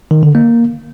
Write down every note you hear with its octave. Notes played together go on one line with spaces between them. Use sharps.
D#3
D3
A#3